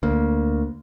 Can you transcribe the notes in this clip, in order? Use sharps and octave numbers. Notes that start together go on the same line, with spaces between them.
D2 A#3